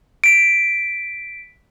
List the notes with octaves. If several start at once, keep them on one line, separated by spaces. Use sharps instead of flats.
B6 D7